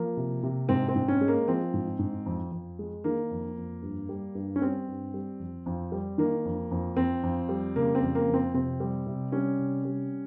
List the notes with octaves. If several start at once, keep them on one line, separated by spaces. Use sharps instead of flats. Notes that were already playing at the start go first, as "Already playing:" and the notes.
Already playing: F3 A#3
C3
C3
G#2 C4
C4
G#2
C#4
G#3
A#3
F3 C4
G#2
G#2
F2
F2
G#3
D#3 A#3
F2
F2
G2
G3
G2
C#4
G3 C4
G2
G3
F2
F2
G3
D#3 A#3
F2
F2
F2 C4
F2
G3
C#3 A#3
C4
F2
A#3
F2
C4
C3 C4
G3
C3
G3 C#4
C3
G3